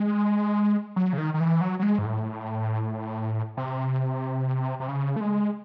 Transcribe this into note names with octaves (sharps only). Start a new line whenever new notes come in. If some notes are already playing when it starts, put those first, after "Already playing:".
Already playing: G#3
F#3
C#3
D#3
D#3
E3
F#3
F#3
G#3
G#2
A2
C3
C3
C#3
A3
G#3